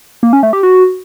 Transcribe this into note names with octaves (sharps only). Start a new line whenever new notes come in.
A#3
C#4
A3
G4
F#4